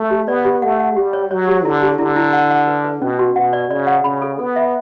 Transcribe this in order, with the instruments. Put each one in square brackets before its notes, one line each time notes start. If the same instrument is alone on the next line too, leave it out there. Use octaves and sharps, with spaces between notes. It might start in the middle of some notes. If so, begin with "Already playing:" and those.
Already playing: [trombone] A3
[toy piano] G4
[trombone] B3 [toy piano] D5
[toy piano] G4
[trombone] A3 [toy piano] F#5
[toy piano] F#5
[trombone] G3 [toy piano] G4
[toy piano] C#5
[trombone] F#3 [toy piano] C#5
[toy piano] G4
[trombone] D3 [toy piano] E4
[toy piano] G4
[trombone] D3 [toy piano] E4
[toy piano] E4
F#5
F#5
B4
B4
[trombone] B2 [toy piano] C#4
[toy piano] F#4
[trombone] B2 [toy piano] F#5
[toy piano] D5
[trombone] C#3 [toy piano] D5
[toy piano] F#5
[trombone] C#3 [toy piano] B5
[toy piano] A4
[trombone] B3 [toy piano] A4
[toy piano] E5